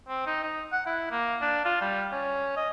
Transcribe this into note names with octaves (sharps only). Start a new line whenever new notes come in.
C4
D#4
D#4
F#5
E4
A#3
D4
F4
G3
C#4
D#5